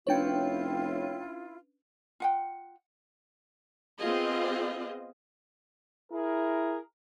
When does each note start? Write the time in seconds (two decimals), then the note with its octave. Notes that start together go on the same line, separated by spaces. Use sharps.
0.07 F1 C#4 D4 E4 F4 B4 C#5 G5
2.20 F4 F#5 G5
4.00 B3 C4 F4 G#4 D#5
6.12 E4 G#4 A#4